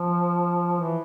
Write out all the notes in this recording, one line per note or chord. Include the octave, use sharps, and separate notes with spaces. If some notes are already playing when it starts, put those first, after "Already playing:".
Already playing: F3
E3